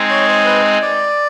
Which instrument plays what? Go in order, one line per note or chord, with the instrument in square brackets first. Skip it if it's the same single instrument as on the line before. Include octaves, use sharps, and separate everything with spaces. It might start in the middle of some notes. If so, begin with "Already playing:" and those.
Already playing: [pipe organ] G#3 C4 D#4 G#4
[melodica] C#5
C5
B4
D5